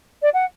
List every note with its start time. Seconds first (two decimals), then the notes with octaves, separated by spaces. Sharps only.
0.22 D5
0.34 F#5